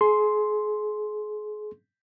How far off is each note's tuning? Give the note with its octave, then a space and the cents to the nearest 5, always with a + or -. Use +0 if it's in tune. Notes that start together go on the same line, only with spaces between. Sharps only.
G#4 +30 C6 +0